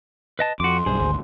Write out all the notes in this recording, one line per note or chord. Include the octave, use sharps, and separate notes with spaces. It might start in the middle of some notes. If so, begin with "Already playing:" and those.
B4 D#5 A5
F2 F#4 C6 D6
B1 G2 G#4 C5
G#1 D2